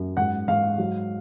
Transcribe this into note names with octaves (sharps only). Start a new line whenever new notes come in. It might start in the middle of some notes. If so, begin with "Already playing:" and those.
Already playing: F#2
G#2 F#5
G#2 F5
F#3